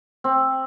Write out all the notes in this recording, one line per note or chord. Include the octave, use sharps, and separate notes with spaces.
C4